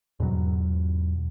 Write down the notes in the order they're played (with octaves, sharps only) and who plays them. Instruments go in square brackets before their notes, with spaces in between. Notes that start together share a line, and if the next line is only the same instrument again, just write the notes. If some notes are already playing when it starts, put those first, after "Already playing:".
[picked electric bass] E2 G#2 B2 F#3